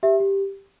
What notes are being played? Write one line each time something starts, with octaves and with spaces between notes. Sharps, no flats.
G4 E5
G4